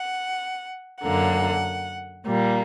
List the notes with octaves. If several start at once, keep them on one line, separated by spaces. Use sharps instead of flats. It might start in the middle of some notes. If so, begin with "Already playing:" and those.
Already playing: F#5
F#2 D3 A#3 F#5
A#2 G3 A#3